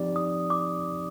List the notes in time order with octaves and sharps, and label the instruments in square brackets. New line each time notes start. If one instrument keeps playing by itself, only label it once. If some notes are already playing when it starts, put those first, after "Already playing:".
Already playing: [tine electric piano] F3 C4 D#4 G4 D5
[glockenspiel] D#6
D6